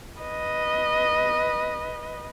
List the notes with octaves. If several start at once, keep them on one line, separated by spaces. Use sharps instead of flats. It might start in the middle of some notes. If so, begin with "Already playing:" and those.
B4 D#5